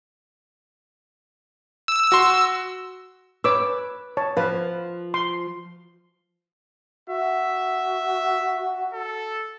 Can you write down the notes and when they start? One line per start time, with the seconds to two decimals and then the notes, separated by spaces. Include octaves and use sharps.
1.88 E6
2.12 F#4 C6
3.44 B4 C#5 D6 E6
4.17 C#5 A5
4.37 F3 B4 F5
5.14 C6
7.10 F#4 E5
8.94 A4